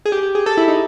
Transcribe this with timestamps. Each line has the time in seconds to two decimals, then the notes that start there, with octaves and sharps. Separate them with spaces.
0.06 G#4
0.12 G4
0.23 G4
0.35 G#4
0.46 A4
0.57 E4
0.68 D#4